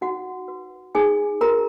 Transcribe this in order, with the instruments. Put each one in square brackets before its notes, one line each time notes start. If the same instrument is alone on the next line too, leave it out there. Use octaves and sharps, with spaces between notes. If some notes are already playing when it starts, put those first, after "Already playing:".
[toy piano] D#4 F#4 F#5
F#4 B4
D#4 G#4 G#5
F#4 A#4 B4 A#5